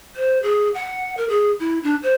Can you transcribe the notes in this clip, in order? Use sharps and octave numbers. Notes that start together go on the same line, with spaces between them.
C5
G#4
F#5
A#4
G#4
E4
D4
C5